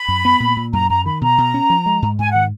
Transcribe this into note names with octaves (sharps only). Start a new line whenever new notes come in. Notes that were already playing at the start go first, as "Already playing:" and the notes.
Already playing: B5
F#2
B3
A#2
A#2
F#2 A#5
F#2 A#5
D#3 B5
B2 A#5
B2
C#4
F3
G#3
G#2
G#2 G#5
D#3 F#5